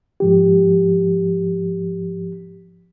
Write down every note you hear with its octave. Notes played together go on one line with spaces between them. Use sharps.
G#2 F3 G4